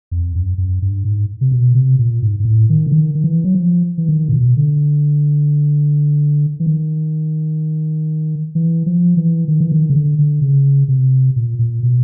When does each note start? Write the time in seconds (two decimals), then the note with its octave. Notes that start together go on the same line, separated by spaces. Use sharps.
0.11 F2
0.35 F#2
0.58 F#2
0.82 G2
1.05 G#2
1.41 C3
1.52 B2
1.75 C3
1.99 A#2
2.22 G#2
2.40 G#2
2.45 A2
2.69 D#3
2.87 D3
2.92 D#3
3.15 D#3
3.24 E3
3.44 F#3
3.55 F3
3.98 E3
4.09 D#3
4.28 A#2
4.33 B2
4.57 D3
6.60 E3
6.66 D#3
8.55 E3
8.86 F3
9.17 E3
9.48 D#3
9.60 E3
9.72 D#3
9.90 C#3
9.96 D3
10.18 D3
10.41 C#3
10.88 C3
11.36 A#2
11.59 A#2
11.83 B2